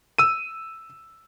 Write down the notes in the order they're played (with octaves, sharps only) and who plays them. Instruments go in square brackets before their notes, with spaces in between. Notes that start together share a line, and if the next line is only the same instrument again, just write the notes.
[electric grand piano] E6 D#7